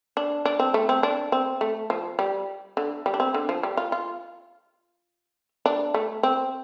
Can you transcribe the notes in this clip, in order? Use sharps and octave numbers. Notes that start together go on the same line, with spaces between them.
D4
D4
C4
A3
C4
D4
C4
A3
F3
G3
D3
G3
D4
C4
D3
F3
G3
F4
F4
D4
A3
C4